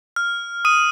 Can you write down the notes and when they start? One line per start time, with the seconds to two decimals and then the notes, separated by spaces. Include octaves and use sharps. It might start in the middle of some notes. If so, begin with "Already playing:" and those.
0.16 F6
0.65 D#6 D#7